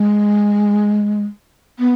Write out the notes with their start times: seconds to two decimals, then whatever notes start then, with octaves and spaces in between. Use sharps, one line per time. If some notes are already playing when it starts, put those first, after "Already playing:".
Already playing: G#3
1.79 B3